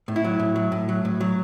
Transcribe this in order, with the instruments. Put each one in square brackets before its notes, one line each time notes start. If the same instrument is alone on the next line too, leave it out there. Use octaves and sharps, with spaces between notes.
[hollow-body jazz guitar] A2
E4
F#3
A2
F#3
A2
F#3
A2
F#3